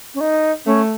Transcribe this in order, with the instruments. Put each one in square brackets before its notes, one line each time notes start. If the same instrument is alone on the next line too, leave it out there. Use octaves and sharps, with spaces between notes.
[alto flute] C#4
D#4
[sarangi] A3 [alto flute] C#4